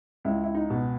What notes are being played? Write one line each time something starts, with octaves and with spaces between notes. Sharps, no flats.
C#2 E4
E4
D#4
B2